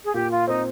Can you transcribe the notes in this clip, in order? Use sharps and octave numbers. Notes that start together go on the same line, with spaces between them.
G#4
A#2 G4
F4
C4 D#4